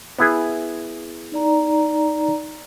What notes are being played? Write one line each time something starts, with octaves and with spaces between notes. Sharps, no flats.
B3 E4 G#4
D#4 D5 A#5